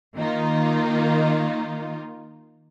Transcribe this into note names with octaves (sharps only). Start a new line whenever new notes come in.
D#3 A#3 D#4 F4